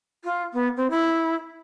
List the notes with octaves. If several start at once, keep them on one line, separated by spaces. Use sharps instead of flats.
F4
B3
C4
E4